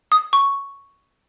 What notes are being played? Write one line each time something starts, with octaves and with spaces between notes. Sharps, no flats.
D#6
C#6